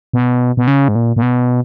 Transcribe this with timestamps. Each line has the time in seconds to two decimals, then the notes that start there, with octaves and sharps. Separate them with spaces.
0.13 B2
0.57 B2
0.67 C#3
0.88 G#2
0.95 A#2
1.16 A#2
1.22 B2